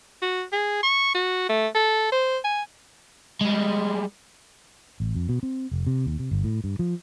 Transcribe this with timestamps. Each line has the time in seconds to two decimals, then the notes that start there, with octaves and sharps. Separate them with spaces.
0.22 F#4
0.52 G#4
0.83 C#6
1.14 F#4
1.49 A3
1.75 A4
2.12 C5
2.44 G#5
3.41 G3 G#3
5.00 A1
5.15 F2
5.29 B2
5.43 C4
5.71 F1
5.87 C3
6.06 D#2
6.19 C3
6.31 G1
6.44 A2
6.64 G2
6.79 F3